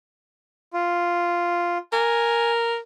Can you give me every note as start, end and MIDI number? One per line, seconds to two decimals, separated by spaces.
0.74 1.78 65
1.93 2.78 70
1.93 2.51 80